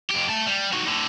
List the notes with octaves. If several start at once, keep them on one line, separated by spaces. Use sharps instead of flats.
F2 G4
A3 A5
G3
D#4 F#4
A2 D3